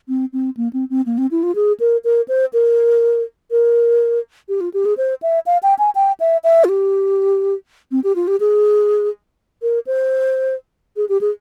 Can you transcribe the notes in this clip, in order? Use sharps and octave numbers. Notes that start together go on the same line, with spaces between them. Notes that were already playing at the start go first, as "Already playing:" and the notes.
C4
C4
A#3
C4
C4
A#3
C4
E4
F4
G#4
A#4
A#4
C5
A#4
A#4
G4
F4
G4
G#4
C5
E5
F5
G5
G#5
G5
E5
E5
F4
G4
C4
G4
F4
G4
G#4
A#4
C5
G#4
G4
G#4